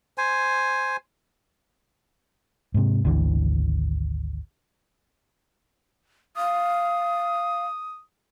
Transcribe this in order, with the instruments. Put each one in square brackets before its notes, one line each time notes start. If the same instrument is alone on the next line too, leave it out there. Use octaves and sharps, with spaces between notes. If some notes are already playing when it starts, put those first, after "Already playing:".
[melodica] C5 G#5
[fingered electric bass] G#2 C3
G#1 D2 D3 E3
[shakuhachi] F5 [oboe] D#6